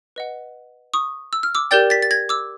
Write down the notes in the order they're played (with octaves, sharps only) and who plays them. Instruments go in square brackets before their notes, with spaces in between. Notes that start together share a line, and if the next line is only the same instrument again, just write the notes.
[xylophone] B4 D#5 F#5
C#6 D#6
E6
F6
D6 E6
G4 A#4 D5 G5 G6 A6
A6 B6
A6
G#6 A#6
D6 E6